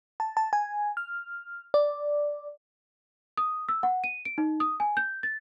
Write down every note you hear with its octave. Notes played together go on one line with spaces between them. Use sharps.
A5
A5
G#5
F6
D5
D#6
E6
F#5
D#7
D7
D#4
D#6
G#5
G6
A6